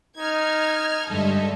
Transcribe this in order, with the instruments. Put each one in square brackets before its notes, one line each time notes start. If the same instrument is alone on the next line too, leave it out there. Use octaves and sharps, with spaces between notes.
[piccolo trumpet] D#4 [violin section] F6 G#6
[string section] G2 [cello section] D3 G#3 [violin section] A4 D#5 E5